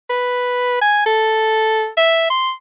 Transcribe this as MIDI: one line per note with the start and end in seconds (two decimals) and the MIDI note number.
0.10 0.79 71
0.82 1.03 80
1.06 1.88 69
1.97 2.25 76
2.30 2.52 84